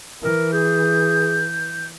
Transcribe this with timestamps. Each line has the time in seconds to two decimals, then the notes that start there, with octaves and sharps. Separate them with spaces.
0.22 E3 A#4
0.53 G#4 G6